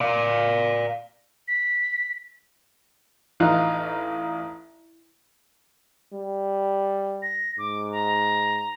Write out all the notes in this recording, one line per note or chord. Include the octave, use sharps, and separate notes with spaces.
D5 F5
B6
A1 D#4 F4 F#6
G3
A#6
G#2 D6
A#5